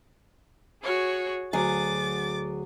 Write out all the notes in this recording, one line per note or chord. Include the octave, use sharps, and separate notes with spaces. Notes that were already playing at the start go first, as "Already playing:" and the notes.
F#4 G#4 C#5
D2 F#3 G#4 D6 A6